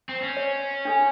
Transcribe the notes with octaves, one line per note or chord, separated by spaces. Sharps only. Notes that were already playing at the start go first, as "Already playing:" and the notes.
C4
C#4
C#5
D4 A4 G#5